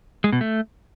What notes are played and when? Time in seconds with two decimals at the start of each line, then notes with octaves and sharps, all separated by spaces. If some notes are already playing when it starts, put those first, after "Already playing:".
0.24 G#3
0.32 B2
0.41 A3